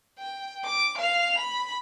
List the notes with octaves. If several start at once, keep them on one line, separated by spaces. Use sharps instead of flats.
G5
D6
F5 F7
B5